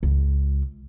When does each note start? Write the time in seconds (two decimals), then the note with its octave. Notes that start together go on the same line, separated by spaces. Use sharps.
0.03 C#2